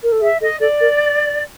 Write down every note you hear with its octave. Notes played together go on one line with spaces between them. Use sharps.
A#4
A4
G#4 E5
A4 D#5
A4 D5
A#4